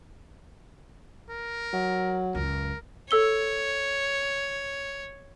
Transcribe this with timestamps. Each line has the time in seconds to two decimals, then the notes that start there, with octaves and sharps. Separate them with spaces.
1.30 A#4
1.73 F#3
2.35 C#2 F#2 A#4
3.11 A4 C#5 E6 G7